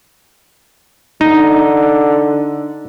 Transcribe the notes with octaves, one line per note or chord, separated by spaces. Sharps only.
D3 D#4